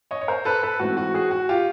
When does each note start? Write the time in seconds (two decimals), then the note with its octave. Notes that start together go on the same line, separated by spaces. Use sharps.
0.11 C#5 D#5
0.21 C#5
0.28 A#4 C5
0.45 A4 B4
0.63 A4 B4
0.79 G#2 E3 A3 C4 F#4
0.97 F#4
1.14 F#4 G#4
1.31 F#4
1.49 F4 G4